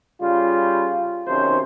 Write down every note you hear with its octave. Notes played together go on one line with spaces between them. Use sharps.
C#3 G3 F4
B1 C3 D#3 C#4 C5